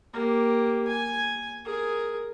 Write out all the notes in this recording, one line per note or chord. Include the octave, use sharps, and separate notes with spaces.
A#3 G4
G#5
G#4 A#4